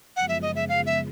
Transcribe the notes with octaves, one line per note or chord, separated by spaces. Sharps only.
F#2 C#3 F3 G#3 B3 F#5
E5
D#5
E5
F5
E5